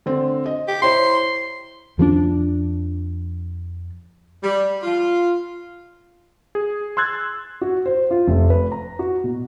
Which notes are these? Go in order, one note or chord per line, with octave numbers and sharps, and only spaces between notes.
D3 C4
D#5
G4
E4 C5 C#5 C6
F2 F3 F#3 D4
G3
F4
G#4
C6 E6 F#6 G#6 A6
F#4
C5
F4
F1
B4
A#5
F#4
B2